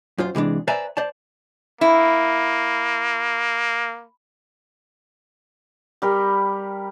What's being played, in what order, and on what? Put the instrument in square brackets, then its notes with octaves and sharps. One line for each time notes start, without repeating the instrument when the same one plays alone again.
[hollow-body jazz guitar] F#2 F4 C5
C3 E3 G#3 D4
B4 C5 D5 E5 G#5 A#5
C5 D5 A5
[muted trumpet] A#3 [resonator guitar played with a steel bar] E4
[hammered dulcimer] G3 G4 A#4